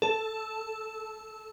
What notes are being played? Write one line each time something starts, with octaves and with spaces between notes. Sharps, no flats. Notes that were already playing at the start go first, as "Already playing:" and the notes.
A4